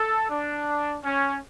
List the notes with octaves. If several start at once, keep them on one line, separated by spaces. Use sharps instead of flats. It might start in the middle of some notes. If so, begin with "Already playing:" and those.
Already playing: A4
D4
C#4